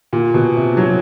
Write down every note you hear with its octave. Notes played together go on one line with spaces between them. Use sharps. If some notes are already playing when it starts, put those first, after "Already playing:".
A#2
B2
C3
F#3